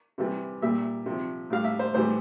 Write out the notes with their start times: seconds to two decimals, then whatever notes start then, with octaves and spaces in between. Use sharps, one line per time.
0.18 C3 E3 G3
0.62 A#2 G3 E5
1.06 C3 F3
1.50 A2 G3 F5
1.64 E5
1.79 C5
1.94 A2 E3 G3 C5